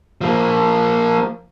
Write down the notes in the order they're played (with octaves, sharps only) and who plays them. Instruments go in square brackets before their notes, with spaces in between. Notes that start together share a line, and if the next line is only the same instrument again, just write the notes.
[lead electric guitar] F3 A#3